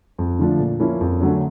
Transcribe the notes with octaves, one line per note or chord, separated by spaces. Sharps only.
F2
D3 F3 A3 D4
A#2
F3 A#3 C#4 E4
F2
D3 F#3 A3 C#4